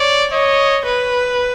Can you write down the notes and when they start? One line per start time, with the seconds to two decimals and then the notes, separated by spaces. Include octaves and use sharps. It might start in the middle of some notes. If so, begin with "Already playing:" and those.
Already playing: C#5 D5
0.32 C#5 D#5
0.85 B4